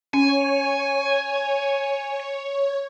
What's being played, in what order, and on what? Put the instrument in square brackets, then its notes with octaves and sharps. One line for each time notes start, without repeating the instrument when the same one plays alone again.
[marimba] C#4 [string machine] C#5 [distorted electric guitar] G#5